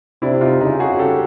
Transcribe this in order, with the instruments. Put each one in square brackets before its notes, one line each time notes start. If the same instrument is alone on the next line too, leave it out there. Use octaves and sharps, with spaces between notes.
[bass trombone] C3 [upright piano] D4 E4
[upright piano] D#4 F4
[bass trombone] C#3 [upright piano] D#4 F4
[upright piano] F#4 G#4
G4 A4